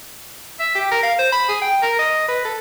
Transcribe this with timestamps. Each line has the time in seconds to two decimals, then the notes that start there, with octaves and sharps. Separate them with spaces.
0.60 E5
0.75 G4
0.92 A#4
1.03 F5
1.19 C5
1.32 B5
1.49 G#4
1.62 G5
1.82 A#4
1.99 D#5
2.28 B4
2.45 A4